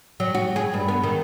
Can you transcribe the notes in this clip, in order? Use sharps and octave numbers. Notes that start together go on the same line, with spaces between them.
F#3
F#4
G#4
G2
B3
D#3